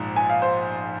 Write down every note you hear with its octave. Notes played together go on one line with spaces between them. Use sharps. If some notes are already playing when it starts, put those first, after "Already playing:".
Already playing: A#1 G#2 F3 A#5
G#5
F5
C5